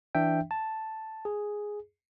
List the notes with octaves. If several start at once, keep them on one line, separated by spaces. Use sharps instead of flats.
E3 D4 E5 G5
A5
G#4